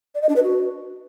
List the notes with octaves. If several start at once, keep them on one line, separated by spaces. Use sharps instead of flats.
D5
D#5
D4
B4
F#4